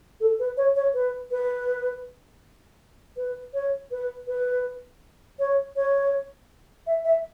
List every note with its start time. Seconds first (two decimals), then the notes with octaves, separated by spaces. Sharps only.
0.20 A4
0.39 B4
0.57 C#5
0.76 C#5
0.94 B4
1.31 B4
3.17 B4
3.54 C#5
3.91 B4
4.27 B4
5.39 C#5
5.76 C#5
6.87 E5
7.05 E5